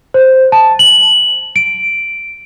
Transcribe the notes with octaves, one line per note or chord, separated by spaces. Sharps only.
C5
A5
F#7
D7